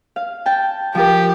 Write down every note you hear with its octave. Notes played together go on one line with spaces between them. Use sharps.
F5
G5 A5
F3 F4 G4 A#4